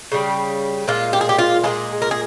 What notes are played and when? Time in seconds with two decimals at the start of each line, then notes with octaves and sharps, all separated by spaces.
0.12 C#3 G3
0.88 A#2 G#3 F4
1.13 G4
1.21 G#4
1.29 G4
1.39 F4
1.63 A#2 F3 G#3 G#4
2.02 A#4
2.11 G#4